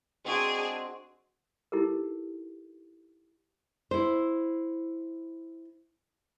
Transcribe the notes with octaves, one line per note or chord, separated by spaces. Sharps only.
G#3 C4 D4 F#4 G#4
D#4 E4 G4 A4 A#4
E4 C5